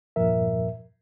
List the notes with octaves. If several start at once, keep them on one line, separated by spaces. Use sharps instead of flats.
E2 G2 A#2 F3 A#4 E5